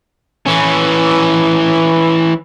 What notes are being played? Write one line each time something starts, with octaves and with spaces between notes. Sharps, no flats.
E3 C#4